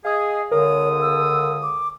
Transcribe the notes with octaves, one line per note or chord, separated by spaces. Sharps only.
G#4 D#5 F5 D#6
C#2 D3 A#4 C#5 D#6
E6
D6